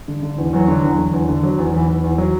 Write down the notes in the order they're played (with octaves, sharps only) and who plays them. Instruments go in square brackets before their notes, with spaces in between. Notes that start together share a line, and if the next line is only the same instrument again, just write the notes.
[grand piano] D3
D3
E2
[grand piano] E2 [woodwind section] F#3
[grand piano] D3
E2
D3
E2
D3
F#3
E2
[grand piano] E2 [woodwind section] E3
[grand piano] E2
E2
F#3